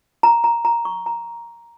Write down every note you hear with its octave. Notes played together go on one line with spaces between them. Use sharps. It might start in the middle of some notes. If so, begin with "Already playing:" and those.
A#5
A#5
A#5
C#6
A#5